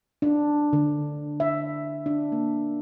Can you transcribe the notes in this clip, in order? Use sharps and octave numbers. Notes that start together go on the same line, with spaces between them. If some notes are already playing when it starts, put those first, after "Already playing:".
D4
D3
E5
D4
A#3